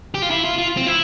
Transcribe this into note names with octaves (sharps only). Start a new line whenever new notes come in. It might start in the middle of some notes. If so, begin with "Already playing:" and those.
G4
F4
E4
F4
F4
C4
E4